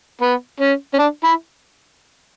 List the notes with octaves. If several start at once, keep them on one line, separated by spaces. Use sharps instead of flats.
B3
C#4
C#4
D4
E4